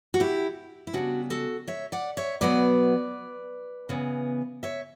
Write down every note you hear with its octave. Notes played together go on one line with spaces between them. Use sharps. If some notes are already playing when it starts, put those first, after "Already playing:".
F#4
E4 G4
E4
C#3 G3 B3 D4 F#4
F#4 A4
C#5 E5
D5 F#5
C#5 E5
B2 F#3 B3 B4 D5
C#3 E3 B3
C#5 E5